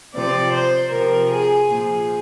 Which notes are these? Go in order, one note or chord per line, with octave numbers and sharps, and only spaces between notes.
C3 F3 D5
C5
C3 F3 A#4
G#4
A#2 F3 G#4